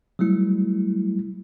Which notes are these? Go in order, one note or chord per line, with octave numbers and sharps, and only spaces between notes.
F#3 G3 A3 E4